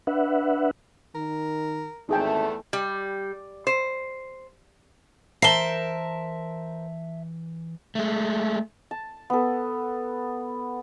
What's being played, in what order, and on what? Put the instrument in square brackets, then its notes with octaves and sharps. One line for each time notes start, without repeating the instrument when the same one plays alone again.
[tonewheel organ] D4 B4 E5 F#5
[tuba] D#3 [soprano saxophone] A#4
[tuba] G#1 [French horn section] E2 A3 [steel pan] D#4 G#4 G5
[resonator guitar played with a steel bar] G3
C5
[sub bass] E3 [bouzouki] A#4 C5 [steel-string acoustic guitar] E5 A5 [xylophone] C7 G7
[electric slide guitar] G#3 A3
[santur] A5
B3 A4